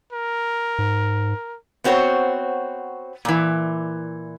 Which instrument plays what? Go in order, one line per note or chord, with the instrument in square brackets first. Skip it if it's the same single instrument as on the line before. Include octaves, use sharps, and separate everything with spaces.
[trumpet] A#4
[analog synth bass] G#2
[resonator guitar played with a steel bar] B3 C4 F#4 C5 C#5
A#2 E3